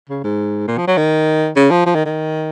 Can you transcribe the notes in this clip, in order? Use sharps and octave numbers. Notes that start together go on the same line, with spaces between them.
C#3
G#2
A#2
F3
F#3
D#3
C#3
F3
F3
D#3
D#3